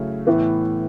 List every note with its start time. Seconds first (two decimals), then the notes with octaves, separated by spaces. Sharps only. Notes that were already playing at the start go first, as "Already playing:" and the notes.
Already playing: C#3 F#3 A3 C#4 E4
0.27 A2 E3 B3